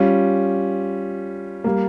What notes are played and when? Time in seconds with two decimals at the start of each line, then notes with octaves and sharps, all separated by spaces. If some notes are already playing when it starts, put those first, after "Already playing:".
Already playing: G3 C#4 F4
1.64 G3 A#3